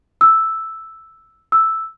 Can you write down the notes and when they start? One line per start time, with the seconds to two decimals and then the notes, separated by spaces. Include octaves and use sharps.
0.21 E6
1.52 E6